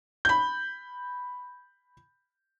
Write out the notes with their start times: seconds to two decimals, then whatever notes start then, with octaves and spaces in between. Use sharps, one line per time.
0.25 B5 G6